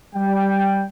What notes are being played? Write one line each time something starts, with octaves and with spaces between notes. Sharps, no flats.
G3 G5